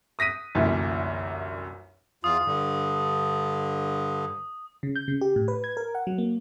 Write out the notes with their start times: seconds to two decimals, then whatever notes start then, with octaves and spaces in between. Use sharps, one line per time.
0.19 D#6 A#6 B6 D#7
0.55 G1 C2 F#2 A#2 E3
2.24 E2 F4 D#6
2.46 G2 D3
4.83 C#3
4.96 G6
5.08 C#3
5.21 G4
5.36 A2
5.48 B4
5.64 G#6
5.77 A#4
5.95 F#5
6.07 F#3
6.18 A#3